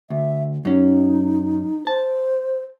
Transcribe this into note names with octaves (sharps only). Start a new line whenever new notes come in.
D2 E5
F#2 C#4 D#4
C5 A5